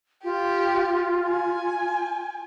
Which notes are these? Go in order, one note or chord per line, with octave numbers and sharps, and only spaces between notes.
F4 G4
G#5